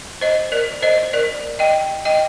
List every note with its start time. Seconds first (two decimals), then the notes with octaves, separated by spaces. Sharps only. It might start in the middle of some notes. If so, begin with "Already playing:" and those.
0.21 C5 D#5
0.52 A#4 D5
0.82 C5 D#5
1.13 A#4 D5
1.59 D#5 G5
2.05 D#5 G5